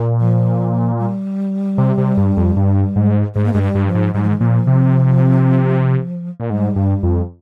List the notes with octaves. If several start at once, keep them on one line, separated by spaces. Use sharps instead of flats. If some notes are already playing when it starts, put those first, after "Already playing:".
Already playing: A#2
F3
G3
C3
C3
G2
F2
G2
G#2
G#2 G#3
A#3
G2 G#3
G3
G2
F3
G#2
G#2 G3
F3
D#3
A#2 F3
C3
A#2
G#2 G3
G2
F2